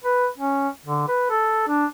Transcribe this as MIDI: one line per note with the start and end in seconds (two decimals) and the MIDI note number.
0.04 0.27 71
0.38 0.68 61
0.85 1.05 50
1.08 1.28 71
1.30 1.66 69
1.68 1.85 62